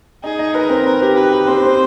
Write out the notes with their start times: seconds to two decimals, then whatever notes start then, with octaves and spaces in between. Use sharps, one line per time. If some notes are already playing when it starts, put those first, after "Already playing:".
0.23 D#4 G#4
0.39 D#4
0.54 A#4 B4
0.70 C4
0.86 A#4 B4
1.02 G4
1.17 G4 B4
1.33 G4
1.48 C4 C5
1.64 C4